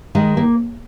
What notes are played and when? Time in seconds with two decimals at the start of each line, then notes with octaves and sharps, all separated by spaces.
0.15 D#3 G#3
0.37 A#3